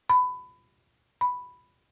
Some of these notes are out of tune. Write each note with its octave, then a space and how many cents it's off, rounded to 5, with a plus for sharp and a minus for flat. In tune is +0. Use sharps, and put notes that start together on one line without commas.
B5 +20
B5 +5